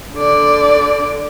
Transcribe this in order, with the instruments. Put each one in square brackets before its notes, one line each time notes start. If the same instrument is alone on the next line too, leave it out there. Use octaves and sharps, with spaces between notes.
[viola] D3 D5